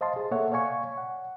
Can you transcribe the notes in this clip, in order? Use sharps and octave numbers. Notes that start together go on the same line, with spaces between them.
C5 D#5 F5 A5 C6
G#4
A#3 A4 C#5 E5 F#5
C#5 D5 F5 G#5 C#6
F#5